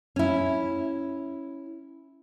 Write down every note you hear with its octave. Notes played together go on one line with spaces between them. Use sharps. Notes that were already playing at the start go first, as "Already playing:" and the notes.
C#4 E4